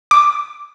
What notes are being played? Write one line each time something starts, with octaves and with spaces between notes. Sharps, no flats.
D6